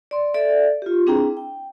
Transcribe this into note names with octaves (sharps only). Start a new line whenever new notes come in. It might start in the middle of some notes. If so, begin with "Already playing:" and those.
D5 C6
A4 D5 E5
F4 G4
C4 D4 E4 G#4 G5 A#5
G5